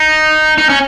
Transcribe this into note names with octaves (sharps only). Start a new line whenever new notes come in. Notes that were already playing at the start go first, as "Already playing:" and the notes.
Already playing: D#4
D#4
C#4